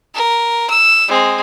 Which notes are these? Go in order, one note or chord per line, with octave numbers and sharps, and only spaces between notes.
A#4
E6
G#3 C4